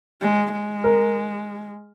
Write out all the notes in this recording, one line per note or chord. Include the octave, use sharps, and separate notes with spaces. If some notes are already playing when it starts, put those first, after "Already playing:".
G#3
G#3
A#4